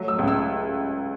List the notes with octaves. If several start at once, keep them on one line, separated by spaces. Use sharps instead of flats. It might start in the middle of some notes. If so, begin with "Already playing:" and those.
Already playing: F#3 A3
E6
C#2
E6